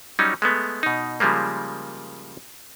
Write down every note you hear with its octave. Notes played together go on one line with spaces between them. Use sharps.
F#3 G3 C#4 D#4
G#3 A3 B3
B2 D#4
C#3 F3 G3 G#3 A#3